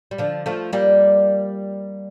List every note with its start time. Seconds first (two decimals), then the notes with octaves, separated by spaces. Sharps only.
0.11 G3
0.18 D3 F3
0.46 F3 A3
0.73 G3 A#3